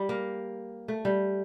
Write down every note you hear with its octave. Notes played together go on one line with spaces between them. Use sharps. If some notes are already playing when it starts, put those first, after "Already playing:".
Already playing: G3
A#3
A3
G3